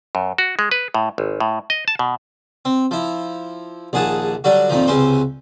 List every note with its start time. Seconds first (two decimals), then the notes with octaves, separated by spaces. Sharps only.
0.15 F#2
0.38 F#4
0.59 G#3
0.71 B4
0.94 A2
1.18 G#1
1.40 A2
1.70 D#5
1.88 A5
1.99 B2
2.65 C4
2.91 F3 E4
3.93 A#1 D#2 G#4 F#5 A5 D#6
4.44 D3 F#3 G3 F#4
4.69 F2 A#2 D#3 F3
4.88 C#2 C3 C#4 B4 C5